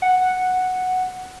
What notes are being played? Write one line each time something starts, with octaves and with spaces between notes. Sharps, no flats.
F#5